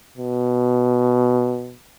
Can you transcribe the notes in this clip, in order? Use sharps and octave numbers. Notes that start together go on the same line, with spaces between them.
B2